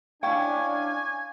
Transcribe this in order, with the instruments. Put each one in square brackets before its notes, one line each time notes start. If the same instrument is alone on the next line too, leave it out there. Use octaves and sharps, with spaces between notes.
[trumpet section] C#4 D4 [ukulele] E4 G5 [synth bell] F5 C#6 G#6 [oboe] G#5